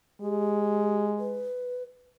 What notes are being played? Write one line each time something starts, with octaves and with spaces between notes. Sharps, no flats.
G#3 G4
B4